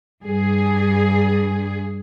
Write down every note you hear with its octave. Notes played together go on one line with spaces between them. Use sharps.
G2 G#4